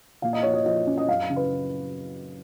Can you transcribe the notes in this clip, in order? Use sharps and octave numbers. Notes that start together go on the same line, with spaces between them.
A#2 F5
D#5
F3 C#5
D#5
F3 D#5
C#4
D#5
F#2 F5
C#3
B4